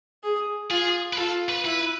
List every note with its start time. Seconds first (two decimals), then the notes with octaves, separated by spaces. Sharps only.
0.23 G#4
0.70 F4 G#4
1.13 B4
1.18 F4 A4
1.49 B4
1.65 E4 B4